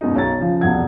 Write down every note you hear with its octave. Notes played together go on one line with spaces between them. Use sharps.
F#2 B2 G#3 D#4
B1 C#5 A#5 A6
C#3 F3
E1 C2 F2 F#5 G#6